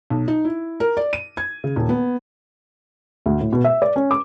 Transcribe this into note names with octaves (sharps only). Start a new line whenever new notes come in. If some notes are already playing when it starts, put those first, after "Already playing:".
B1
D#4
E4
A#4
D5
D#7
G#6
C#3
D#1
B3
D2
A2
B2
E5
D5
C#4
D6